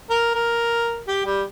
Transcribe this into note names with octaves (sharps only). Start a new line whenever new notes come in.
A#4
A#4
G4
G3